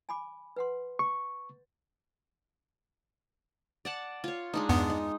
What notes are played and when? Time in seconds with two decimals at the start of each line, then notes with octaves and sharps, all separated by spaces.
0.09 G#5 B5 D6
0.56 B4 F#5 C6
0.99 C#6
3.85 D5 F#5 A5
4.24 F4 C#5
4.54 G#3 D4 D#4
4.69 E2 G2 B3
4.90 D#4